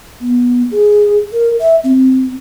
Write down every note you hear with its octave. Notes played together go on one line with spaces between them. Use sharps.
B3
G#4
A#4
E5
C4